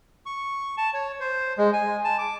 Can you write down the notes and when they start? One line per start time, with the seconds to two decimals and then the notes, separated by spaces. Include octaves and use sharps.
0.26 C#6
0.77 A5
0.94 C#5
1.20 C5
1.58 G#3
1.73 G#5
2.04 A5
2.18 D6